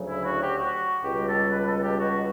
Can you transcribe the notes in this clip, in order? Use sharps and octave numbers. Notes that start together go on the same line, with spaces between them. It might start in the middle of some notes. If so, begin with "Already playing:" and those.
Already playing: D2 C#3 F#3
E4
F#4
G4
F#4
C#2 B2 G3 G4
A4
B4
A4
G4
F#4